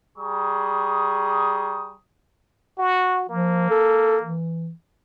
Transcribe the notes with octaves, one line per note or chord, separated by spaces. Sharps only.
G3 G#4 A#5 C#6 D#6
F#4
F3 A#3
A4
E3